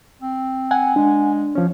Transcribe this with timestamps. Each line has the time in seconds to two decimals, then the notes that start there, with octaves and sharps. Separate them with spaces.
0.22 C4
0.71 F#5 G#5
0.96 G#3 D4
1.55 F3 C#4